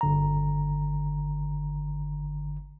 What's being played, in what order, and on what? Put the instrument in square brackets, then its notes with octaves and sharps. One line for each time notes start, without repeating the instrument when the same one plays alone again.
[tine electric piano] G1 D3 A#5